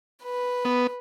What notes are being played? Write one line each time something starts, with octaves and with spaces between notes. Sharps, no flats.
B4
B3